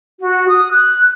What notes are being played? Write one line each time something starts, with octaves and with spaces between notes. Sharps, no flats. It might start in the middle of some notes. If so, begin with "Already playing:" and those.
F#4
D#6
F#6